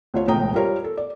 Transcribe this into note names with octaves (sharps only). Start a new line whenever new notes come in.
D2 F4 C#5
E1 C#2 A2 G5 A#5 D#6
G3 F4 A#4 C#5
A4
D5